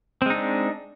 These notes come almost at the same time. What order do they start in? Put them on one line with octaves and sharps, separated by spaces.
C4 G#3 D#4 D4